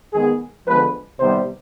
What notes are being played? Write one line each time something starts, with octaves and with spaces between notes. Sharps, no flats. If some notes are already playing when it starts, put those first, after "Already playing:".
D#3 G#3 B3 G#4
D3 F3 G#3 B3 B4
C3 D#3 G3 B3 C5